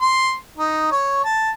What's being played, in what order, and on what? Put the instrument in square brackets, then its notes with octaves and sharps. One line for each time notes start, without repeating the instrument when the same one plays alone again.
[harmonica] C6
D#4
C#5
A5